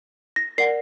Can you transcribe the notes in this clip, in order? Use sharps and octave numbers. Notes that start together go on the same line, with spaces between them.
A#6
A#4 D5 F#5 C7